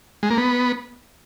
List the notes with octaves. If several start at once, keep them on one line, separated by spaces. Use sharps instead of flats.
G#3
A#3
B3